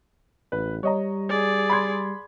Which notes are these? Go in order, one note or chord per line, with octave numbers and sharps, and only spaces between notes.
A1 B4
G3 C#5 D#5 A#5
G#4 D5
B5 C6 G#6